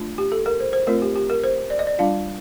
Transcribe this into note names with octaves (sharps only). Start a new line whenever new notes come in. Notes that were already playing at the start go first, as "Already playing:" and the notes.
Already playing: A3 D4 F4
G4
A4
A#4
C5
C5
A3 C4 F4 A#4
G4
G4
A#4
C5
D5
D#5
D5
G3 D4 F4 F5